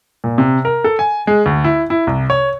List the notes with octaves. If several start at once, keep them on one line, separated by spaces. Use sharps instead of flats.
A#2
C3
A#4
A4
G#5
G#3
D2
E4
E4
C2
C#5